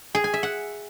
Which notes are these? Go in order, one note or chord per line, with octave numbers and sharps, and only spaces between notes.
G#4
G#5
E5
F#5